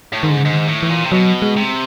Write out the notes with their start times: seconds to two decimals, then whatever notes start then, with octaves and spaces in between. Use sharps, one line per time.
0.13 A2
0.23 G#2 D#3
0.30 D3
0.37 C#3
0.44 G#2 D3
0.52 D#3
0.68 A2
0.83 E3
0.89 A#2
1.04 C3
1.12 B2 F#3
1.42 G#3
1.57 C3